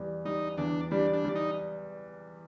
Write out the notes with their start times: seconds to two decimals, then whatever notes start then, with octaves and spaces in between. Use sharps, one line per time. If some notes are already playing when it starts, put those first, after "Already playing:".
Already playing: E2 G3
0.25 G3 D#4
0.58 E2 D4
0.91 G3 D4
1.13 D4
1.25 G3
1.35 D#4